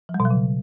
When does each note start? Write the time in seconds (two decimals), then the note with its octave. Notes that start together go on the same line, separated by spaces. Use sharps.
0.09 F3
0.14 G3
0.20 B2
0.25 F#3
0.30 C#3